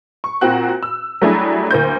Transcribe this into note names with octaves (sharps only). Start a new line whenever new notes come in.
C#6
A#2 C4 F#4 F#6
E6
F#3 G3 A3 D4 E4 G#4
D2 A#3 C5 G6